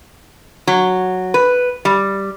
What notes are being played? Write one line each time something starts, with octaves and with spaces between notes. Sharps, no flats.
F#3
B4
G3